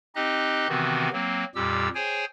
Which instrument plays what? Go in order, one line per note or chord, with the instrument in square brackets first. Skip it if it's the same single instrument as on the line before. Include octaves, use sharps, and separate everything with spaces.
[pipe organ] C4 D#4 G4 D#5 F#6
C3 D#3 E3 B3 C4 F#4
F#3 A#3 C4
F2 A#2 G3 G4 E6
G#4 C5 C#5 G5 G#5